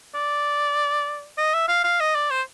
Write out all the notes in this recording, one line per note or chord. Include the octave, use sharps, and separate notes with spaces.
D5
D#5
E5
F5
F5
D#5
D5
C5